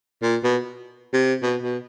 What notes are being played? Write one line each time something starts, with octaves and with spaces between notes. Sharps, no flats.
A#2
B2
C3
B2
B2